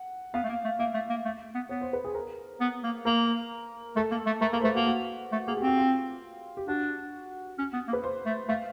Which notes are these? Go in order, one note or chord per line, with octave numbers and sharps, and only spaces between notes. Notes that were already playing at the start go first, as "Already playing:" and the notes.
Already playing: F#5
B3 F5
A3
A#3
A3
A#3 E5
A3
A#3
A3
B3
B3 C#5
C5
B4
G#4
A#4
B3
A#3
A#3 A#4
A3 A4
A#3
A3
A3 A#4
A#3 A#4
C5
A3 B4
A#3 F#4
F#4
A3
A#3 G#4
G4
C4 F#4
F4
G4
D4 F#4
C#4
B3
A#3
B4
C5
A3
A3 F5